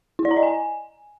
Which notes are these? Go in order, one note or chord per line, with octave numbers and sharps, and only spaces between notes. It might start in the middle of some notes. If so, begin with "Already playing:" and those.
E4
D5
A#5
D#5
G#5